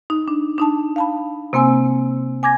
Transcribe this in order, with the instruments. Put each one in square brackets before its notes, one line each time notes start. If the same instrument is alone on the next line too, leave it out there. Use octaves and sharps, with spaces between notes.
[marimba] D#4
D4
D4 D#4 A5
F5 A5 B5
C3 A#3 C4 G#5 E6
G#5 D6 G#6 A#6